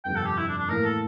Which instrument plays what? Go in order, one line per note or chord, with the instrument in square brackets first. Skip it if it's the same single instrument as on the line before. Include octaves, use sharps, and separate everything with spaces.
[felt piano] G1 F2 C3 [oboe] G5
[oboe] A4
G4
E4
D4
D4
[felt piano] A2 E3 A#3 [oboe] A#4
[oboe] A4